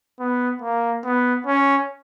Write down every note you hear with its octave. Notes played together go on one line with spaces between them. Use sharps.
B3
A#3
B3
C#4